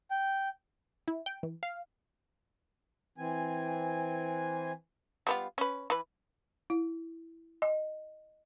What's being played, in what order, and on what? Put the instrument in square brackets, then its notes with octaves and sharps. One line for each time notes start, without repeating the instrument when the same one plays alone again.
[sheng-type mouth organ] G5
[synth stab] E4
G5
E3
F5
[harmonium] E3 C4 G#5
[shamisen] G3 B3 F4
C#4 B4
E3 B4
[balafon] E4
D#5